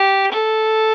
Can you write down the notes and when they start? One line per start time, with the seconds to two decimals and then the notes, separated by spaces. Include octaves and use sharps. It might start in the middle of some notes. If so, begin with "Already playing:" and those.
Already playing: G4
0.32 A4